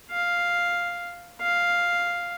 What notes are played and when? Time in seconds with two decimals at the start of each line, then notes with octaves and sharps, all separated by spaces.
0.11 F5
1.42 F5